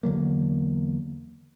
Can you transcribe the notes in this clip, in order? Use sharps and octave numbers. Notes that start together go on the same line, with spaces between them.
E2 D3 F#3 A#3